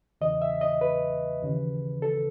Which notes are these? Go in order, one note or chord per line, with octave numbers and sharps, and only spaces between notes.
E2 C#3 E3 D#5
E5
D#5
B4
D#2 C#3 E3
A4